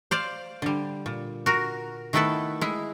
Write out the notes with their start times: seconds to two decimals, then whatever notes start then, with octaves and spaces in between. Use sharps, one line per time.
0.11 C5 D5 F5
0.62 D3 G3
1.06 A#2
1.46 F#4 A#4
2.13 D#3 A3 B3 E4 A4 B4
2.61 G#3 E4